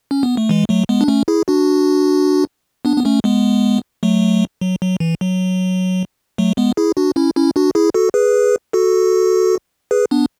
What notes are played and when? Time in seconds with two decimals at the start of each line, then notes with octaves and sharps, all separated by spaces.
0.11 C#4
0.23 B3
0.37 A3
0.49 E3 G#3
0.69 F#3 A3
0.89 G#3 B3
1.01 D4
1.08 A3 C#4
1.28 E4 G#4
1.48 D4 F#4
2.85 B3 D4
2.97 B3
3.05 A3 C#4
3.24 G#3 B3
4.03 F#3 A3
4.61 F#3
4.82 F#3
5.00 E3
5.21 F#3
6.38 F#3 A3
6.57 G#3 B3
6.77 E4 G#4
6.97 D4 F#4
7.16 C#4 E4
7.36 C#4 E4
7.56 D4 F#4
7.75 E4 G#4
7.94 F#4 A4
8.14 G#4 B4
8.73 F#4 A4
9.91 G#4 B4
10.11 B3 D4